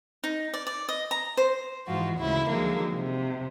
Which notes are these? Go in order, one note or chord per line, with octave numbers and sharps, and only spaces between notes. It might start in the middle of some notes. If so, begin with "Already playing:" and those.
D#4
D5
D5
D#5
A#5
C5
G#2 E3 F3 F4 F#4
D2 G#2 C#3 E4
D3 D#3 F3 F#3 G#3 A#3
C3